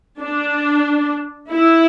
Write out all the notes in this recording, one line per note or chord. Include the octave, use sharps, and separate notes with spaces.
D4
E4